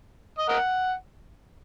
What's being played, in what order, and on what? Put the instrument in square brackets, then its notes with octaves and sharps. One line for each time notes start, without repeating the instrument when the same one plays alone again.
[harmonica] D#5
A#4 D#5 F#5